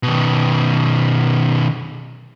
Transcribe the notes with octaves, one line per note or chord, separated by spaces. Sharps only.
B2 D#3